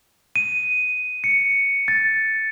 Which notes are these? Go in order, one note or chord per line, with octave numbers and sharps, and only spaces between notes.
D#7
C#7
A6